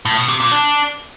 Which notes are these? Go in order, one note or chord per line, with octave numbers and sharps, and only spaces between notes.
A2
B2
C3
A#2
D4